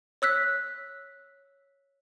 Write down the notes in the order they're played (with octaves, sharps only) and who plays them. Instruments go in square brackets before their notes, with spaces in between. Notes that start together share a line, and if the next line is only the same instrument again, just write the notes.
[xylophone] C#5 E6 F#6 B6